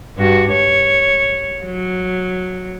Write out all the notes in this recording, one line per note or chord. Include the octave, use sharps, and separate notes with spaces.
G2 F#4
C#5
F#3